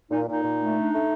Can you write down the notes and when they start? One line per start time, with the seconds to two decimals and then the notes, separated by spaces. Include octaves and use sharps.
0.11 A#2 D#4
0.28 A#2 D#4
0.44 A#2
0.61 A3
0.77 D4
0.93 A3